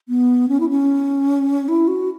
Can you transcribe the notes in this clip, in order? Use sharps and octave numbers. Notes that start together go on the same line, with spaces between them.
B3
C#4
E4
C#4
E4
F#4